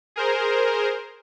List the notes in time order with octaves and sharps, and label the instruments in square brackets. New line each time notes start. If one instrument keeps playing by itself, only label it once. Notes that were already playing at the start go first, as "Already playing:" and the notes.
[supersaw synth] G#4 A#4 C5